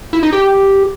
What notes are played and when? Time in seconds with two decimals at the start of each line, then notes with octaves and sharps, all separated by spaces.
0.13 E4
0.23 D#4
0.33 G4